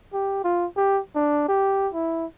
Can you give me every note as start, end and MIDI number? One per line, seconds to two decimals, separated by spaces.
0.13 0.44 67
0.45 0.66 65
0.77 1.00 67
1.15 1.45 62
1.48 1.89 67
1.94 2.26 64